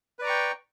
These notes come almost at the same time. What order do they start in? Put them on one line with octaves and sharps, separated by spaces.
B4 D5 A#5 C#6 G5